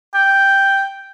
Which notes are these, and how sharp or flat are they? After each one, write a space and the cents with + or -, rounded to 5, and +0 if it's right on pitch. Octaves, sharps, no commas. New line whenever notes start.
G5 +0